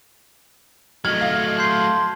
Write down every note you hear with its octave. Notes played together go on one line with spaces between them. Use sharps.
F#3 A3 D#5 F6 G#6
F5
A5 C6 G6 C7